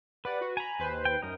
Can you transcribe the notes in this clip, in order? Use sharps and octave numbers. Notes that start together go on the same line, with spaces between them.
G4 B4 D5 F#5
F#4
G#5 A#5 B5
D#2 B4 C5
G5
F#2 D#4 A#4